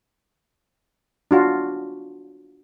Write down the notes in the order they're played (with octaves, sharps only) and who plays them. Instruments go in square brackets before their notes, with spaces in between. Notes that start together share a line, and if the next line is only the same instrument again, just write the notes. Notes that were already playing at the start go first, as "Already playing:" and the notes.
[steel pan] D4 F4 F#4